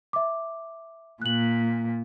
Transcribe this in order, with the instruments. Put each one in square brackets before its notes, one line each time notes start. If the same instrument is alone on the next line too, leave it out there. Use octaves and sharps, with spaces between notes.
[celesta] E5 D6
[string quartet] A#2 [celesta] F#6 F#7